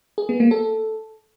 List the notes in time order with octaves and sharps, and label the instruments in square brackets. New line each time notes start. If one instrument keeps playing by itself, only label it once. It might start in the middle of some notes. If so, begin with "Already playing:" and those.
[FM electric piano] G#4
B3
A#3
A4